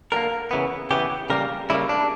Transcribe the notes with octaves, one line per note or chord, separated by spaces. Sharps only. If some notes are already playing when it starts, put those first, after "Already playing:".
D3 G3 A#3 A#4
C#3 E3 B3
C#3 E3 B3 G4
C#3 G3 A#3 A#4
C#3 G3 A#3 E4
D4